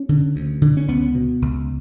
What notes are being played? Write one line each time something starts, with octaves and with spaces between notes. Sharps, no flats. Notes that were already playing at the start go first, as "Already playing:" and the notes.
Already playing: C#4
D3
D2
D3
C#4
C#2 B3
B2
C#2